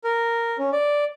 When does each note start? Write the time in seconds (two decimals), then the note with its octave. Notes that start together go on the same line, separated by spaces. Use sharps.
0.04 A#4
0.58 C#4
0.72 D5